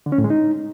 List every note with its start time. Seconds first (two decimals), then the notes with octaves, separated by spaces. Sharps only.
0.06 D3
0.12 C#4
0.18 A2
0.24 G#3
0.30 D#4